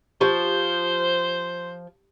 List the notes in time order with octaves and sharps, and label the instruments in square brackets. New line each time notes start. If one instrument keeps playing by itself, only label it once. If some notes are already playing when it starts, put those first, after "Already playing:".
[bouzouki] F3 [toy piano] G4 [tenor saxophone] C5